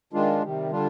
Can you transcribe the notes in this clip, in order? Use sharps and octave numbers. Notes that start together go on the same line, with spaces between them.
D#3 G#3 D4 F4
C3 D#3 G3
D3 G3 D4 F4